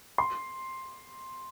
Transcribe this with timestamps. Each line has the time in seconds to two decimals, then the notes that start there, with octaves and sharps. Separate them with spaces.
0.18 C6